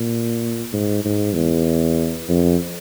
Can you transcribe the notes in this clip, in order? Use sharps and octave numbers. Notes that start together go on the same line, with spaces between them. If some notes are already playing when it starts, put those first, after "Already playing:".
Already playing: A#2
G#2
G#2
E2
F2